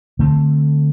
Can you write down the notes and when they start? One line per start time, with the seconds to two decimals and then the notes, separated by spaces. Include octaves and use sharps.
0.19 D3 A3 C4